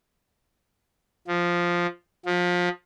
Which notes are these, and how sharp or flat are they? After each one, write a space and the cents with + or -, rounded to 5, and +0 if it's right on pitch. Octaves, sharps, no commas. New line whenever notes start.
F3 +0
F3 +25